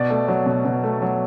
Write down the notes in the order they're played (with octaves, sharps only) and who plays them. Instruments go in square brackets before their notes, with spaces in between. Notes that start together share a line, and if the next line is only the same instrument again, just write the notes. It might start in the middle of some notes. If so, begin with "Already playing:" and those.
Already playing: [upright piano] B2 D5
A3
F#3
B2
B2
A3
F#3